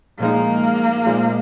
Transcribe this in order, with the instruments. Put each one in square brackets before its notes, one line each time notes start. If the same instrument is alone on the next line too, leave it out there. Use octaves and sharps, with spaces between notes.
[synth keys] A#2 F3 G#3 D#4 [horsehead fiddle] A#3
[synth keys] A#2 F3 G#3 D#4